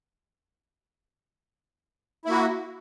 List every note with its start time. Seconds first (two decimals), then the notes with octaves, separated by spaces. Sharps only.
2.25 E4
2.28 A#3
2.31 F#4